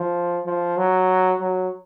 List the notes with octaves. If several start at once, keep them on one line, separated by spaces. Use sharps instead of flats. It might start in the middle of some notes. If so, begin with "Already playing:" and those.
Already playing: F3
F3
F#3
F#3